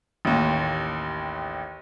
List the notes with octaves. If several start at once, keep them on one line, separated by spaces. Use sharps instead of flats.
A1 D#2